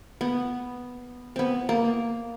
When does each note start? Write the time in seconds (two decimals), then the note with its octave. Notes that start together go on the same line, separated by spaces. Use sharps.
0.21 B3
1.36 B3 C4
1.69 A#3